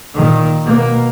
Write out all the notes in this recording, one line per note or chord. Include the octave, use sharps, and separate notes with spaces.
A#2 D#3
B2 A#3